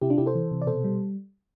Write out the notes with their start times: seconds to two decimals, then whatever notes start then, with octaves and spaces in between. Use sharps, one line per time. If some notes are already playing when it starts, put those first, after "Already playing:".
0.01 C3 E4 G4
0.10 D4 F4
0.18 C3 E4 G4
0.26 A4 C5
0.35 E3
0.51 C3
0.62 D5
0.67 B2 A4 C5
0.84 G3